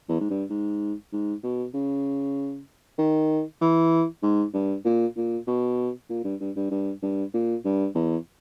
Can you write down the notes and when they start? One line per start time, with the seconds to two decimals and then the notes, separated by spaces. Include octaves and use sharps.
0.09 E2
0.21 G#2
0.30 G2
0.50 G#2
1.13 G#2
1.44 B2
1.74 C#3
2.99 D#3
3.61 E3
4.23 G#2
4.54 G2
4.85 A#2
5.17 A#2
5.47 B2
6.10 A#2
6.24 G2
6.40 G2
6.57 G2
6.71 G2
7.03 G2
7.34 A#2
7.65 G2
7.95 E2